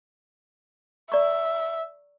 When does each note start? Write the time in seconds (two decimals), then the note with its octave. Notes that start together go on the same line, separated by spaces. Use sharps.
1.12 D5 E5 A#5 C#6